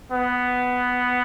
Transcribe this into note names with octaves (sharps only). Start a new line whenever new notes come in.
B3